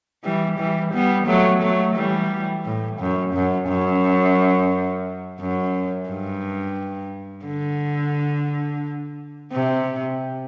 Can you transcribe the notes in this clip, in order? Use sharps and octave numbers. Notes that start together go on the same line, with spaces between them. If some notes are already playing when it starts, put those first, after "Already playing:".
E3 G3
E3 G3
G3 B3
F#3 A3
F#3 A3
E3 G3
A2
F#2
F#2
F#2
F#2
G2
D3
C3